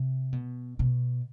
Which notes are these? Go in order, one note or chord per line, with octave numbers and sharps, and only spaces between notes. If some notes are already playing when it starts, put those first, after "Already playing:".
Already playing: C3
B2
B2